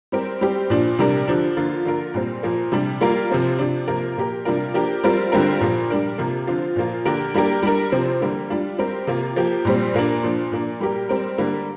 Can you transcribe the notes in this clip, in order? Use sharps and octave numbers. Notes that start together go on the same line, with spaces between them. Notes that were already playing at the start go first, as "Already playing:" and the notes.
G3 C4 G4 A#4
G3 C4 G4
A#2 F3 D4
C3 G3 D4 A#4
D3 F3 D4
D3 F3 A#3 F4
D3 A#3 F4 A#4
A#2 G3 C4
A#2 F3 A#3
C3 G3 D4
G3 A#3 F4 A#4
C3 F3 C4 F4
C3 F3 D4
C3 F3 A#3 F4 A#4
A#2 A#3 G4 A#4
C3 G3 D4 F4 A#4
F3 A#3 D4 G4 A#4
G3 C4 F4 A#4
D3 G3 C4 F4 A#4
A#2 F3 A#3
G3 D4 A#4
C3 F3 A#3 F4
D3 F3 C4 F4
A#2 F3 A#3 F4
D3 A#3 D4 G4 A#4
G3 A#3 D4 G4 A#4
G3 D4 A#4
C3 F3 C4
D3 G3 A#3
G3 D4 F4
G3 C4 G4 A#4
C3 A#3 F4
F3 A#3 G4
A#2 G3 C4
A#2 A#3 D4
A#2 F3 D4
A#2 A#3 D4
G3 A#3 G4 A#4
G3 C4 A#4
D3 G3 A#3